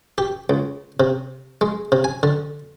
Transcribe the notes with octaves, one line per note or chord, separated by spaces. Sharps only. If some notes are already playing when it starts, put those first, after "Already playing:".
G4
C#2
C3
G#3
C3
G#5
D3